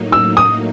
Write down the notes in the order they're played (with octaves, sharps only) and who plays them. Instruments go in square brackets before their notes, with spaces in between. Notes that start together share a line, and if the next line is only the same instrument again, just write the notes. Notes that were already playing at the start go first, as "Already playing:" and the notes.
Already playing: [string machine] A2 F#3 A#3 D#4
[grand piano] E6
D#6